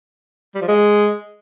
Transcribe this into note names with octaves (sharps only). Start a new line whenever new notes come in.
G3
F3
G#3